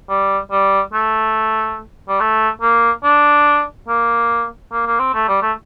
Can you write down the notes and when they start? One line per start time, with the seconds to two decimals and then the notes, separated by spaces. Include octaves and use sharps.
0.09 G3
0.51 G3
0.93 A3
2.09 G3
2.20 A3
2.62 A#3
3.04 D4
3.88 A#3
4.72 A#3
4.87 A#3
5.00 C4
5.14 A3
5.28 G3
5.42 A3